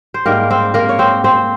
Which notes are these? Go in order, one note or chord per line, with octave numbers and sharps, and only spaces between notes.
C5
G#2 G3 A#3 A#4
C4 C5
A#3 A#4
C#5
C4 C5
C4 C5